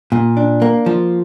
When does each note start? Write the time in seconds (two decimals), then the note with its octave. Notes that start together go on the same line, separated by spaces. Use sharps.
0.12 A#2
0.37 D4
0.62 A#3
0.86 F3